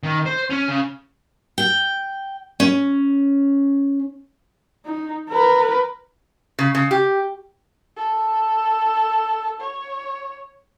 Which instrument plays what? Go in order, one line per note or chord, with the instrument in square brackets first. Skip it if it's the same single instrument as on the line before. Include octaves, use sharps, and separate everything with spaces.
[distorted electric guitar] D#3
C5
C#4
C#3
[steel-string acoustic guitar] G5
C#4
[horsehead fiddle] D#4
A#4 B4
[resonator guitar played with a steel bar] C#3
C#3
G4
[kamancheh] A4
C#5